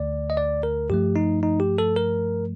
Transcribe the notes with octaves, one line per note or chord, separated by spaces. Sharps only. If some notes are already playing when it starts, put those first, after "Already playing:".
Already playing: D2 D3 A3 D5
D#5
D5
A#4
G2 F3 A3 G4
D#4
D#4
G4
A4
A#4